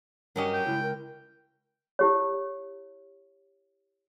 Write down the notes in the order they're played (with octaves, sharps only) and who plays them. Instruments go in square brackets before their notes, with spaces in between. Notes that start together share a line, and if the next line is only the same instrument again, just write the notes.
[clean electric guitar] G2 D#5 [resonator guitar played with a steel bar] F#3 C#4 G4 [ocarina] A#4
[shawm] G5
[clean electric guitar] C#2 [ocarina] E4
[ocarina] A#4
[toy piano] E4 G4 C#5